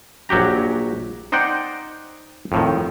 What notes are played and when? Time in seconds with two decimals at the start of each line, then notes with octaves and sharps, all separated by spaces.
0.29 A#1 F#3 F#4 G4 A#5
1.32 D#4 C5 D5 F#5 G5
2.52 F2 A2 D#3